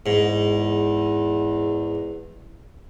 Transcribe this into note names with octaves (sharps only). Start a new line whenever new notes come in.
E2 G#2